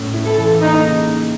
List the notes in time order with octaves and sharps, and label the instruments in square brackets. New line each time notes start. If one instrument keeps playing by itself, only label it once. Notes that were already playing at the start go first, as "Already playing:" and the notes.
Already playing: [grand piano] A2 C#4
E4
[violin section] A4
[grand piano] E3
[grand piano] A#3 [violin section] D#4
[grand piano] C#3